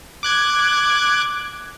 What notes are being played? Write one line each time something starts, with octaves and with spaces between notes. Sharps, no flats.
D6 F#6 G#6